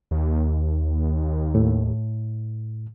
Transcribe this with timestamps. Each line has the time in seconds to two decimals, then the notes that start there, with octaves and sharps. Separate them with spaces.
0.11 D#2
1.55 A2